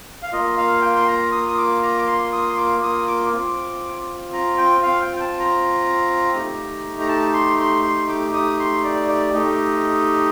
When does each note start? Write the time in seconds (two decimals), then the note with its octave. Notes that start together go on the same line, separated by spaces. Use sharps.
0.23 F5
0.32 A#3 F4 D#5
0.57 F5
0.82 G5
0.96 C6
1.07 A#5
1.32 D#6
1.49 D#6
1.58 D6
1.83 A#5
1.97 D6
2.07 C6
2.32 D#6
2.49 C6
2.57 D6
2.83 D#6
3.08 D6
3.33 C4 F4
4.33 A#5
4.58 G5
4.83 F5
5.02 G5
5.16 G5
5.20 A5
5.40 A#5
6.33 A3 D#4 G4
7.00 A#5
7.09 A5
7.34 C6
7.59 C6
7.84 C6
8.09 D6
8.34 D#6
8.59 C6
8.84 D5
9.09 D5
9.34 A3 D#4 G4 D#5